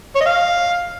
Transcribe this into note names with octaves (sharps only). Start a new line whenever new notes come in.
C#5
D#5
F5